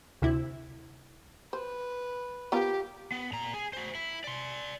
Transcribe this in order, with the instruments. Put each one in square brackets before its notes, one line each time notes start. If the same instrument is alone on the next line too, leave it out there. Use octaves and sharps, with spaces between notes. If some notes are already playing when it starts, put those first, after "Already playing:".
[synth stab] D2 C3 E4
[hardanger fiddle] B4 [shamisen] C5
[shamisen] B3 F4 A#4 [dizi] G4
[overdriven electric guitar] B3
A#2 A#5
G#4
F#4 C5
E4
D5 C6